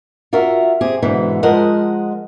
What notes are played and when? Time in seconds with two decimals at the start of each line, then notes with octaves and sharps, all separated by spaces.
0.33 F4 F#4 A#4 E5
0.81 C4 G4 G#4
1.02 G#2 B2 D3 E3
1.43 F3 G#3 A#4 D#5 F#5